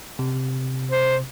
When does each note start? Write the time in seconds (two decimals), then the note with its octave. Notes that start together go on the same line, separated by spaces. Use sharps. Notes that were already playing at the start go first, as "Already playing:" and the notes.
0.19 C3
0.91 C5